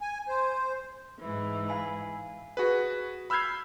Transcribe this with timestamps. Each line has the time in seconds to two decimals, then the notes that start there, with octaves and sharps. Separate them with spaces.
0.01 G#5
0.28 C5
1.19 G#2 E3
1.69 F5 G#5 B5
2.57 F#4 G#4 B4
3.30 B5 E6 F6 G6 G#6 C7